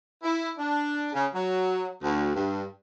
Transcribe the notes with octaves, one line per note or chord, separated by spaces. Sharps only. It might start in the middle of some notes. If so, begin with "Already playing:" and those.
E4
D4
C#3
F#3
D2
G2